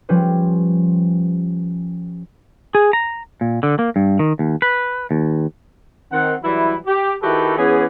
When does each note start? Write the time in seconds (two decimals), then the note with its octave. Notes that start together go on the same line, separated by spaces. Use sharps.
0.09 F3 G3 C#4 B4 C5
2.75 G#4
2.93 A#5
3.41 A#2
3.63 D3
3.79 A#3
3.96 G2
4.19 D#3
4.39 D#2
4.62 B4
5.11 D#2
6.12 D#3 C4 F#5
6.44 E3 F#3 G3 E4
6.86 G4
7.22 D#3 E4 F#4 G4 A4 B4
7.58 E3 B3 C#4 G#4